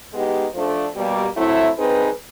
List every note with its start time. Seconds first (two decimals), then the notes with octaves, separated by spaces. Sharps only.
0.13 G#3 B3 D#4 G4
0.54 F3 A3 D4
0.95 B2 G3 A#3
1.36 F#3 A3 C4 E4
1.76 G3 C4 D#4 G#4 B4